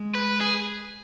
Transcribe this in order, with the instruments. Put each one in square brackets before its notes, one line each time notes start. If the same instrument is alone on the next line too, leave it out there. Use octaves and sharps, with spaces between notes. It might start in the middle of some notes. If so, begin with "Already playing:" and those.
Already playing: [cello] G#3
[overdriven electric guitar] B4
G#4